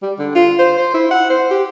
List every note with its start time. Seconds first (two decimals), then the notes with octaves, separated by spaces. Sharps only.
0.02 G3
0.19 D3
0.35 F4
0.59 C5
0.77 C5
0.94 E4
1.11 F#5
1.30 C5
1.51 G4